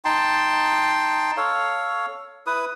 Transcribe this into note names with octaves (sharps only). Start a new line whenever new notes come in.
D#4 G5 A5 C6
A4 C#5 F5
E4 B4 D#6